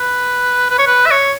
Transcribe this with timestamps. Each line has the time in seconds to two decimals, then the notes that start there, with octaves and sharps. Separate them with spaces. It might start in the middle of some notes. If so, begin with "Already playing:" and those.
Already playing: B4
0.70 B4
0.79 C#5
0.87 B4
1.06 E5
1.11 C#5